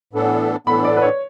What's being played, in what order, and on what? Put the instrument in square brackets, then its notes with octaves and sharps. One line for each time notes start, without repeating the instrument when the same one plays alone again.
[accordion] A2 E3 B3 D4 A4
[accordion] A2 E3 B3 D4 A4 [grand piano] B5
[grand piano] D5
B4
C#5